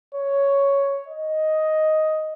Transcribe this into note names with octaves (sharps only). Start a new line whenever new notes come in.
C#5
D#5